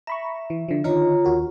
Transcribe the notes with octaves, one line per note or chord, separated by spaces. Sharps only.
E5 A#5 B5 C#6
E3
D3 F3
D3 D#3 D#4 F4 C#5 A#5
D#2 F#4 A#4